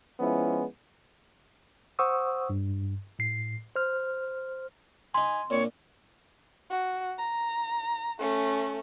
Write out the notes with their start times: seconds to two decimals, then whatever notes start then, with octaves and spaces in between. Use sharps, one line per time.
0.20 F3 G#3 B3 C#4 E4
1.99 C5 F#5 C#6 D#6 E6
2.50 G2
3.19 A2 C7
3.76 C5 F6
5.14 D#4 F#5 G#5 B5 C6
5.50 A#2 C4 D4 C#5
6.70 F#4
7.18 A#5
8.19 A3 C#4